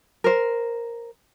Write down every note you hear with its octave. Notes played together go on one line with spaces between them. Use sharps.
A#4 C5